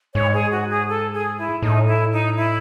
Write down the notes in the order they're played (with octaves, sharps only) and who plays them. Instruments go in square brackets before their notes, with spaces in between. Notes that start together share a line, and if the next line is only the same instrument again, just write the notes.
[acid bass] G#2 [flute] C#5
[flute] G#4
F#4
G#4
A4
G#4
E4
[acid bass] A2 [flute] D#4
[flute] E4
D#4
E4